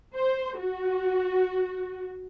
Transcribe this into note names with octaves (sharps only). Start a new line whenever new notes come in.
C5
F#4